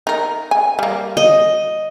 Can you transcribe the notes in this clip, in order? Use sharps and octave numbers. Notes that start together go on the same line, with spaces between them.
D#4 A#4
G#5
G3 A#3
D#5